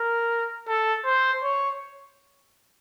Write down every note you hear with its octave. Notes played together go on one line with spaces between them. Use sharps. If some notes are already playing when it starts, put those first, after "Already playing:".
Already playing: A#4
A4
C5
C#5